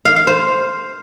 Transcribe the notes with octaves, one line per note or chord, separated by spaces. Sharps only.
F5
F5
C5